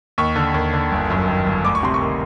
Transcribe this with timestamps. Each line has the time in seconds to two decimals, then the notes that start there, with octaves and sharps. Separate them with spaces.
0.18 D#2 C#6
0.36 D3
0.54 D#2
0.74 D3
0.92 G1
1.10 F#2
1.28 D#3
1.47 G1
1.65 D2 D6
1.75 C#6
1.83 C3 C6
1.94 C#6
2.01 D#3